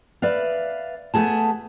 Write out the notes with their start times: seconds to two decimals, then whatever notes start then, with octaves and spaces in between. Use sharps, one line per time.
0.22 B4 D5 E5 F5
1.14 A3 B3 G#4 A5